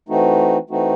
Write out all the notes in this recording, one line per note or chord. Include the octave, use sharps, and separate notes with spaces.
E3 A3 C4 D#4 F#4
E3 A3 C4 D#4 F#4